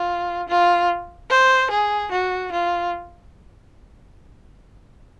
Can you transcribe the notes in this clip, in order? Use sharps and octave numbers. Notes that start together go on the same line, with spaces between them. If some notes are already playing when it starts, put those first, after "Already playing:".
Already playing: F4
F4
C5
G#4
F#4
F4